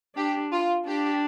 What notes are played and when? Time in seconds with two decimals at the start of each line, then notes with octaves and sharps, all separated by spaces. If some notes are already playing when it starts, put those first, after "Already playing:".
0.16 D4 G4
0.52 F4
0.87 D4 G4